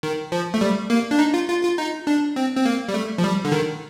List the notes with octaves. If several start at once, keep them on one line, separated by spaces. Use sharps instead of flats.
D#3
F3
A3
G3
A#3
D4
D#4
F4
F4
F4
D#4
D4
C4
C4
A#3
G3
A3
F3
G3
D3
D#3